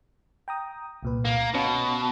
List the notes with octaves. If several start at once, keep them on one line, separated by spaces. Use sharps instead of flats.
G5 A#5 D#6
C2 A#2 B4
A#3
B2 C#4